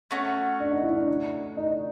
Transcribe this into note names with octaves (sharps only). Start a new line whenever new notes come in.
A3 C#4 F#4
D4
D#4
E4
D4
D#4